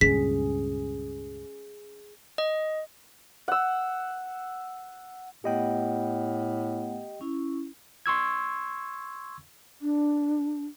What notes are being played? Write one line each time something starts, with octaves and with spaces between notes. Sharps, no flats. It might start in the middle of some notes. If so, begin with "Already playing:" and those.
C#2 G2 A#2 C#4 G#4 B6
D#5
F#5 E6
A2 A3 B3 G4 D#5 F#5 G5
C#4 E4
C6 C#6 E6 G#6
D4